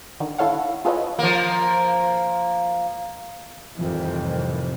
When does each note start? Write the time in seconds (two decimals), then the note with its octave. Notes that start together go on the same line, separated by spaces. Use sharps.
0.20 D3 D#3
0.38 E4 A4 C#5 F5 F#5
0.85 F4 G#4 A4 B4 C#5 D#5
1.19 F3 A#3
3.78 F2 A2 C3 D#3 E3 G3